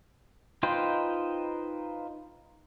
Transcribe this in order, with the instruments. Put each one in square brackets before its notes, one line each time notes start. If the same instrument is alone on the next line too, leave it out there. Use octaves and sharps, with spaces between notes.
[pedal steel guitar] D#4 F4 B4 C5 G5